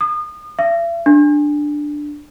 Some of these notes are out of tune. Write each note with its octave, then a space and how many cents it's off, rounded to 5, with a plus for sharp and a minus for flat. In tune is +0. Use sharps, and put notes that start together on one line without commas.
D#6 -30
E5 +45
D4 +5